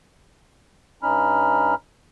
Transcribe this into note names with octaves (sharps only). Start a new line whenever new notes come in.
G2 C#4 D#4 B5 F6